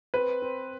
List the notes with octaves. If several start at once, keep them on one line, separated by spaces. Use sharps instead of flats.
C4 B4
C4